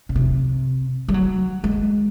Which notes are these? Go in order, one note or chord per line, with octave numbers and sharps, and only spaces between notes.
C#3
C3
G3
F#3
G#3